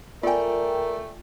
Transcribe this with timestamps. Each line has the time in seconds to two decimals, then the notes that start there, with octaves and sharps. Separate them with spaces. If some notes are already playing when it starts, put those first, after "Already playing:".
0.23 A3 F4 A#4 D5 G5 G#5